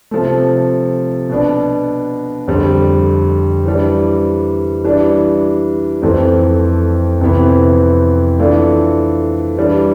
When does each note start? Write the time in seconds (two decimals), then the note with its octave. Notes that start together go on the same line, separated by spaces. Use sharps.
0.11 C3 F3 A3
1.29 B2 B3 D4
2.48 F2 D3 G3
3.65 E3 G3 D4
4.84 E3 G3 D4
6.02 F2 E3 A3 C4
7.21 F2 C3 E3 B3
8.39 E3 A3 D4 F4
9.57 E3 G3 D4